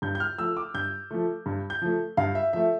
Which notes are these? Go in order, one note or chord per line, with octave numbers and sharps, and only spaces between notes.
G2 G6
G6
F6
F3 A3 E6
D6
G2 G6
F3 A3
G2
G6
F3 A3
G2 F5
E5
F3 A3 E5